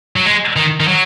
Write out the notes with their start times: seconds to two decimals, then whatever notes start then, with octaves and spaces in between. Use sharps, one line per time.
0.16 F#3
0.25 G#3
0.56 D#3
0.80 D#3
0.88 F#3